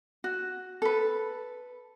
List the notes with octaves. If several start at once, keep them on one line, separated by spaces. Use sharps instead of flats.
F#4
A4 B4